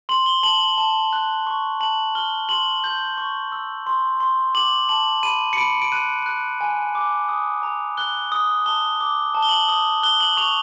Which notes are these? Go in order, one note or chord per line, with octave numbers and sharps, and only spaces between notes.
C6 F#7
G7
A5 F#7
A5
F#6
C#6
A5 F#7
F6 G7
C6 F#7
G6
C#6
E6
C6
C6
D6 F#7
A5 F#7
B5 D#7
C#7
B5 D7
D7
F#6 D#7
F#6
G#5
D6
D#6
A#5
F#6 G7
D#6
A5 G7
D6
A5
G7
F#7
G7
D#6
F#6 G7
F#7
C#6 F7